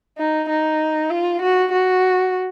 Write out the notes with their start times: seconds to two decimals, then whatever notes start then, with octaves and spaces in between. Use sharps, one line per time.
0.18 D#4
0.50 D#4
1.10 F4
1.42 F#4
1.72 F#4